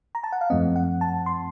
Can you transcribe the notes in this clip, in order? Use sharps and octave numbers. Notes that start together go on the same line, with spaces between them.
A#5
A5
F#5
F5
F#2 F3 A3 C4 D#5
F#5
A5
C6